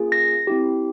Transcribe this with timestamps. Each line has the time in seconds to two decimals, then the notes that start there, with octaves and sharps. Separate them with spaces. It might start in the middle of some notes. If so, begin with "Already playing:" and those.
Already playing: A#3 C#4 F4 G#4
0.12 A#6
0.47 C4 E4 G4